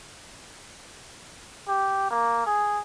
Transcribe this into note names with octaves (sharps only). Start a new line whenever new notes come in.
G4
A#3
G#4